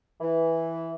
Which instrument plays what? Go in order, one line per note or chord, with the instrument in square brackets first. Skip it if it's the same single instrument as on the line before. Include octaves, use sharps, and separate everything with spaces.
[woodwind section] E3